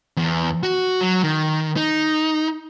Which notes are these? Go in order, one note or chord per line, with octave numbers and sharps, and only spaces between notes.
E2
F#4
F#3
D#3
D#4